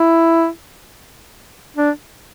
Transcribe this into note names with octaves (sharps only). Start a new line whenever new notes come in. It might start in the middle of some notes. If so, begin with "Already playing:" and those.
Already playing: E4
D4